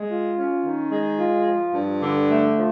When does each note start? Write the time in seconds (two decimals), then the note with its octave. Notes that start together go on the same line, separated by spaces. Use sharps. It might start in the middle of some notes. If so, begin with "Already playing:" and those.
Already playing: G#3
0.09 F4
0.36 C#4
0.64 D#3
0.91 G#3
1.19 F4
1.46 F3
1.74 G2
2.01 D3
2.29 A3
2.56 F3